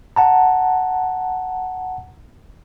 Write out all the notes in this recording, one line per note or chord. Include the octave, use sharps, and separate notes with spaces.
F#5 A5 A#5